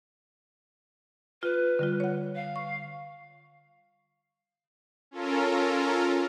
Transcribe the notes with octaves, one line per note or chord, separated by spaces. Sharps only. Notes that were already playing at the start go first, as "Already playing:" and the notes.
F4 B4
D3 G3 F4
C#5 F#5
F5
C#6
C#4 F4 A4 A#4